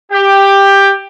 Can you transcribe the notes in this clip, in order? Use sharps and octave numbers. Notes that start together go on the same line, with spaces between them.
G4